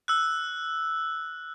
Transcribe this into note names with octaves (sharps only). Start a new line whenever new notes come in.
E6 F#6